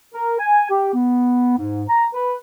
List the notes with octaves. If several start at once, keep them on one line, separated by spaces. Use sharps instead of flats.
A#4
G#5
G4
B3
G#2
A#5
B4